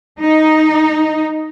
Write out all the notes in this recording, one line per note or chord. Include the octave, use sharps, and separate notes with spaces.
D#4